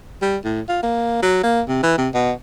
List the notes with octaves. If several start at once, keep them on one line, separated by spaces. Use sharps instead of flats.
G3
A2
F4
A#3
F#3
A#3
C3
E3
C3
B2